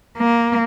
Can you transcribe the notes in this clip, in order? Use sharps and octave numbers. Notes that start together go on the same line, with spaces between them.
A#3